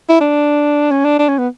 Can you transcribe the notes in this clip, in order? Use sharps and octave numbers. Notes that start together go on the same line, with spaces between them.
E4
D4
C#4
D4
D4
C#4
B3